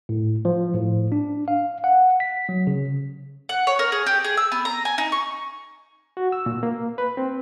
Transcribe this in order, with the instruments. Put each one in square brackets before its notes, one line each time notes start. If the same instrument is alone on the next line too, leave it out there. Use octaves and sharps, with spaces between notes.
[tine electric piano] A2
F3
A2
D4
F5
F#5
B6
F#3
C#3
[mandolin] F#5
C#5
A#4
G#4
G4
G#4
E6
B3
A#5
G#5
D#4
C#6
[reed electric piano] F#4
E6
A#2
A#3
B4
C4